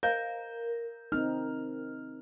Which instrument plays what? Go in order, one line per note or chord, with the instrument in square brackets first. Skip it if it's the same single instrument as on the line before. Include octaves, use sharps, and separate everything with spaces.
[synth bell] A#4 [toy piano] C5 D#5 F5 [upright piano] G6
[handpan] C4 D#4 [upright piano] F6